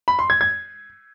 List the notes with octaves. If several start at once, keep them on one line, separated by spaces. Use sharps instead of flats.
B5
C6
G#6
G#6